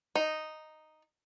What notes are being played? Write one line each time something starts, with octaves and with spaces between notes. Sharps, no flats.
D#4